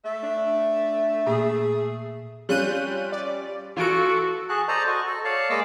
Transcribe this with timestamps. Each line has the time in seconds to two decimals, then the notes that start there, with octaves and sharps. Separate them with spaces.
0.05 A3 E5
0.23 D4
1.27 A#2 A#3 G#4
2.49 G3 C#4 F4 F#6 G6 D#7
3.12 D5
3.77 E3 F4 F#4 A4 D7
4.49 F#4 G#4 A5 F#6
4.68 A4 C5 D5 D#5 A5 A#5
4.87 F#4 D#5
5.07 A4
5.25 C#5 D5 F5 A5
5.50 G#3 A#3 A4 D#5 D6 E6